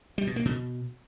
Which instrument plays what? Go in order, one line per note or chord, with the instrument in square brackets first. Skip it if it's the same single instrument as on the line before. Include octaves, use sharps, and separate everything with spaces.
[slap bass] G3
B2
A#3
B2